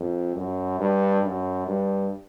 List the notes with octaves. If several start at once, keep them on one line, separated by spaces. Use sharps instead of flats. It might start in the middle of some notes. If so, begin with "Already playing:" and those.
Already playing: F2
F#2
G2
F#2
G2